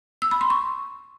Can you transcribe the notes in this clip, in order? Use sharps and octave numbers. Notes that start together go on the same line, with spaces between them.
E6
B5
C6
C#6